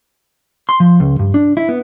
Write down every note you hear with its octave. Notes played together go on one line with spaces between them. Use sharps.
C6
F3
C#2
G2
D4
E4
B3